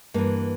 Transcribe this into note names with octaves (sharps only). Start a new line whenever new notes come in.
G2 E3 A#3